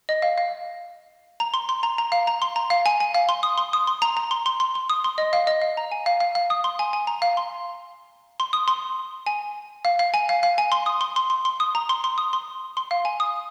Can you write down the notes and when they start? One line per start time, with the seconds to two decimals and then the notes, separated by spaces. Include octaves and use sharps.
0.09 D#5
0.22 F5
0.38 F5
1.40 A#5
1.54 C6
1.69 C6
1.83 A#5
1.98 A#5
2.12 F5
2.27 A#5
2.42 C6
2.56 A#5
2.70 F5
2.86 G#5
3.00 G#5
3.14 F5
3.29 C6
3.43 D#6
3.58 C6
3.73 D#6
3.87 C6
4.02 A#5
4.17 A#5
4.31 C6
4.46 C6
4.60 C6
4.75 C6
4.89 D#6
5.04 C6
5.18 D#5
5.33 F5
5.47 D#5
5.62 F5
5.77 A#5
5.92 G#5
6.06 F5
6.20 F5
6.35 F5
6.50 D#6
6.64 C6
6.79 G#5
6.93 G#5
7.07 A#5
7.22 F5
7.37 C6
8.40 C6
8.53 D#6
8.68 C6
9.26 G#5
9.85 F5
9.99 F5
10.14 G#5
10.29 F5
10.43 F5
10.58 G#5
10.72 C6
10.86 D#6
11.01 C6
11.16 C6
11.30 C6
11.45 C6
11.60 D#6
11.75 A#5
11.89 C6
12.04 C6
12.18 D#6
12.33 C6
12.77 C6
12.91 F5
13.05 G#5
13.20 D#6